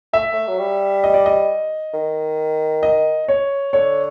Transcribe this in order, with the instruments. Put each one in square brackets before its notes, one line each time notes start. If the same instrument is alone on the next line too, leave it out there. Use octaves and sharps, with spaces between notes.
[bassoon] A3 [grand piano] E5
[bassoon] A3
F#3
G3
[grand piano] D#5
D5
D#5
[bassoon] D#3
[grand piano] D#5
C#5
[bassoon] D3 [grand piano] C#5